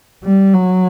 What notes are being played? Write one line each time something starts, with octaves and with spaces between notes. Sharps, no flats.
G3
F#3